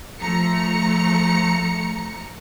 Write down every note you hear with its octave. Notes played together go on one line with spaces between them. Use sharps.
F3 A3 A#5 C#7